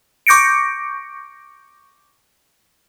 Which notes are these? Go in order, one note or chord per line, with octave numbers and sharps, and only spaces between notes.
C#6 D6 G6 A#6 C#7 D7